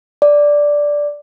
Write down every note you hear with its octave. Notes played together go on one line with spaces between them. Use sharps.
D5